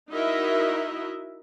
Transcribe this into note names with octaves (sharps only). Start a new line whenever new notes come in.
D#4 E4 F#4 A#4 D#5 E5